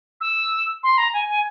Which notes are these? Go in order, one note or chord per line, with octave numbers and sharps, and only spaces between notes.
E6
C6
A#5
G#5
G#5